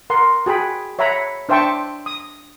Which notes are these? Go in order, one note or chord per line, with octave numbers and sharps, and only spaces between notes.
A#4 F#5 C6
F#4 G#4 G5 B5
C#5 E5 F#5 A#5 B5
D4 C5 E5 G5 A5 C#6
D#6